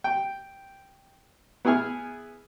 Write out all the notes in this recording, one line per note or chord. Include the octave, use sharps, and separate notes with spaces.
G5
B3 E4 G#4 G#5 F6